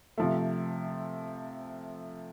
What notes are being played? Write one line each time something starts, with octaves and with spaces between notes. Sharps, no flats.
C3 F3 A3